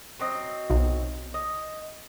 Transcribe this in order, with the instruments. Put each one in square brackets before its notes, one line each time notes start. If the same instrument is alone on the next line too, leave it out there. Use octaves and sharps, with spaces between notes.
[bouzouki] F#3 C4 D#5
[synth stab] B1
[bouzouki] D#5